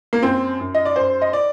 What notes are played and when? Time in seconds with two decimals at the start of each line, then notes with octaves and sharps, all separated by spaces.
0.13 A#3
0.22 F#2 C4
0.60 F#2
0.75 D#5
0.85 D5
0.96 F#2 C5
1.22 D#5
1.33 D5